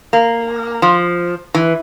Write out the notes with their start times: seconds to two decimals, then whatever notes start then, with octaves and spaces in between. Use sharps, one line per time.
0.13 A#3
0.82 F3
1.54 E3